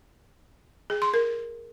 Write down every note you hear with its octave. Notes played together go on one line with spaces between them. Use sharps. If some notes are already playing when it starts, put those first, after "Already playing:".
G#4
C6
A#4